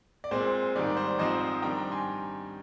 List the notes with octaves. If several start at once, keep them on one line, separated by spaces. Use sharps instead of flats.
D5
A#2 G#3 C4 C5
G#2 D#3 G3 D5
D5
C5
D5
G#2 F3 C4 D#4 C5 D#5
D#3 G3 D4 G5 A#5
G5 A#5
G#5 C6